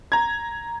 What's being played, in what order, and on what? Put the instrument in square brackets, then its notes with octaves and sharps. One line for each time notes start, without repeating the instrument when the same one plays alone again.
[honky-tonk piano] A#5 G#6